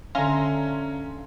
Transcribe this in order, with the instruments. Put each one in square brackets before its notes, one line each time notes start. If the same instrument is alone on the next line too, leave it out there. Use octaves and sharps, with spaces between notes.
[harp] D3 E5 [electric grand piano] C#4 G#5 [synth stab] F5 A#5 C6